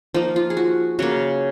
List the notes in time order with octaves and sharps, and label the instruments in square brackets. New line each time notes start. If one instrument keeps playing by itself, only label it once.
[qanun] F3 A#3 D#4
F4
G#4
F#4
C#3 F#3 A#3 F#4